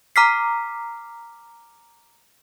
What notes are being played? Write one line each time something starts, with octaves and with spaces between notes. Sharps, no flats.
A#5 D6 F6 B6 C7